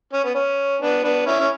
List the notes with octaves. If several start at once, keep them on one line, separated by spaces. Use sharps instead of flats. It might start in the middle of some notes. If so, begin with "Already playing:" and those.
C#4
B3
C#4
B3 D4
B3 D4
C#4 E4
C#4